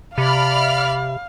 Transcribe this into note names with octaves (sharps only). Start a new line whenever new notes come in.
C3 D5 F5 B5 F6